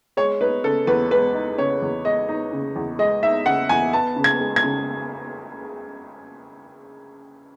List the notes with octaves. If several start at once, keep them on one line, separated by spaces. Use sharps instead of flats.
G#3 C#5
D#4 B4
C#3 A4
E2 B4
G#3 B4
D#4
C#3 C#5
E2
G#3 D#5
D#4
C#3
E2
G#3 D#5
D#4 E5
C#3 F#5
E2 G#5
B3 A5
C#3
G#6
G#3
G#6
C#3